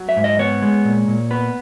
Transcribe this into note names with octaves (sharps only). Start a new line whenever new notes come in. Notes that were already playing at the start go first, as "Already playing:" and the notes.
Already playing: F#3
E5
G#2
D#5
B3 C#5
G#3
A#2
A#2
B3 B4